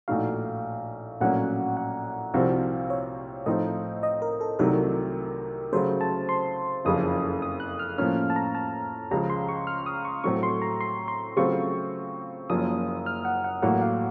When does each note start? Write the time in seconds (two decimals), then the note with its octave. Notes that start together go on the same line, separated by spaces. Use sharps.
0.08 A#1 A2 A3 D#4 F#4 F5
1.20 A#1 A2 F#3 A#3 C#4 F#5
1.77 F#5
2.34 C2 C3 F3 C4 F#4 F5
2.90 C#5
3.46 A2 F3 C4 D#4 D#5
4.03 D#5
4.22 A#4
4.41 A4
4.59 C2 C3 D#3 F#3 A3 A#4
5.73 C#3 F#3 A3 C5
6.01 A5
6.29 C6
6.85 F#1 F2 C#3 F3 D#6
7.42 D#6
7.60 F#6
7.79 F6
7.98 A2 F3 A#3 C#4 F6
8.30 A5
8.36 A#5
8.55 A5
9.11 C#2 C#3 F3 A#5
9.30 C6
9.49 C#6
9.67 F6
9.86 D#6
10.05 C#6
10.24 A2 F#3 A3 C4 C#6
10.43 C6
10.62 A#5
10.81 C6
11.08 C6
11.36 C#3 F#3 A3 C4 F4 C#6
12.50 F#1 F#2 F3 A#3 D#6
13.06 F6
13.25 F#5
13.44 F#5
13.62 A1 A2 F#3 A#3 F#5
13.82 F5